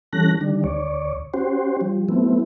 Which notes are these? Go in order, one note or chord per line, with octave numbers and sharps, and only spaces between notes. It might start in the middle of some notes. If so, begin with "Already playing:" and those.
E3 G3 C#4 A4 F#6 A#6
D3 D#3 G3 D4
D2 C#5 D5
C#4 F#4 G4 C5
F3 G3
F#3 A3 B3 C4 E4